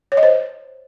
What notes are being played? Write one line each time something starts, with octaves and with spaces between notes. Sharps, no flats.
C#5
D#5
C5